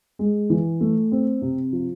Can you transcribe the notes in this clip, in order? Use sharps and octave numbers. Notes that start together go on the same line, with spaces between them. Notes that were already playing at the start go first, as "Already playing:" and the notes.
G#3
E3
A3
C4
C3
F3